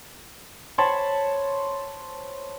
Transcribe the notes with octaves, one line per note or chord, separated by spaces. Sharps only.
C5 C#5 A5 B5